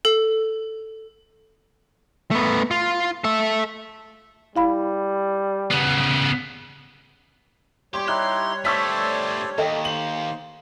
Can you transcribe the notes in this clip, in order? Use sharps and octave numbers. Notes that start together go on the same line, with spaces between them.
A4
A3 B3
F4
A4 E5
G3 E4 F5 B5
C#3 B3
G3 G4 C#5 G5 C6
D#4 E4 G4 C6 F#6
G2 A3 A4 C5 D5 C#6 E6 B6
D#2 A4 D#5 G5
C5 F#7